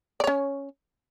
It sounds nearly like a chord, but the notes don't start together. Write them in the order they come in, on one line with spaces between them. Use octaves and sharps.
D5 C#5 C#4